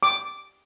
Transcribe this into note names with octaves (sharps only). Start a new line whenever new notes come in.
D6